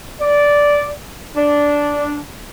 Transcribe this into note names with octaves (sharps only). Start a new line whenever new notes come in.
D5
D4